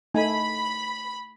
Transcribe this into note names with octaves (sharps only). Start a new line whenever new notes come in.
A3 D#4 G#5 B5